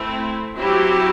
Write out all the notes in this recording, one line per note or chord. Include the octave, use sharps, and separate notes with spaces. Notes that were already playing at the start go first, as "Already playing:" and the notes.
Already playing: A3 C4 E4
F#3 C4 E4 G4